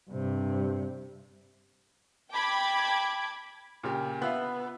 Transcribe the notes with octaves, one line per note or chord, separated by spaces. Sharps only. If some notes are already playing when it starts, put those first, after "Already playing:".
G2 C3
G5 A5 B5 D6 G#6
A#2 C#3 G4
B3 F4 E5 F5